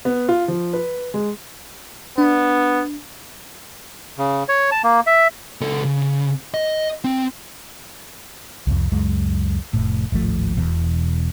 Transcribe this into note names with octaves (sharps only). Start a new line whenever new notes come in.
B3
F4
F3
B4
G#3
B3 D4
C#3
C#5
A5
A#3
E5
C#2 A4
C#3
D#5
C4
C2 F2
C#2 F#2 G#3
F1 A2
D1 G#1 F3 A3
E1 E2 B2